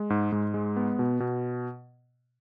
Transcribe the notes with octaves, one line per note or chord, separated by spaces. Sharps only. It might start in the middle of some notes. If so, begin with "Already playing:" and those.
Already playing: G#3
G#2
G#2
G#3
B3
B2
B2